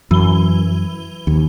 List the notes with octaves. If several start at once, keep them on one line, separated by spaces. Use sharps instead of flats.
F#2 E3 G7
D#2